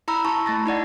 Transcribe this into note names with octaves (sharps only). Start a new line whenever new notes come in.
E4 A#5 B5 E6
E4 A5 C#6
A3 A6 A#6
D#4 E4 D5 F#5